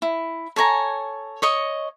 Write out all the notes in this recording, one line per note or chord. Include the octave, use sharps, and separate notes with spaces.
E4
A4 C#5 G#5 A#5
C#5 D#5 C#6